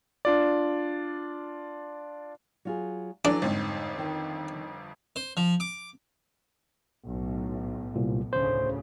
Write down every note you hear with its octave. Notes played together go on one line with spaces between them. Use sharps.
D4 F4 D5
F#3 F4 G#4
E3 F#3 D4 A4 D5
G1 F2 G#2
D#3
C5
F3
D6
B1 A2
C2 A#2
D2 A2 C#3 C5